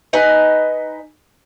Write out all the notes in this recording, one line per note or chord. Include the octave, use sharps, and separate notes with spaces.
D#4 B4 D#5 G#5